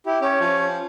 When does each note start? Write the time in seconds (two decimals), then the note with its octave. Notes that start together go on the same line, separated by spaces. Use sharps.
0.06 E4 G4
0.21 C#4 G4 C#5
0.41 F3